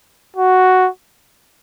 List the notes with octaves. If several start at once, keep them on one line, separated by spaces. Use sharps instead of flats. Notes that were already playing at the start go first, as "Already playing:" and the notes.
F#4